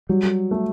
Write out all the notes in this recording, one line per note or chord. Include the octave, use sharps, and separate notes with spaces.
F#3 G3
A3